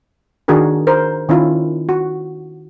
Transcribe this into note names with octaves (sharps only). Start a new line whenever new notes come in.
D#3 D4 F#4 G#4 A#4
A#4 C5
D#3 C#4 E4 F4
F#4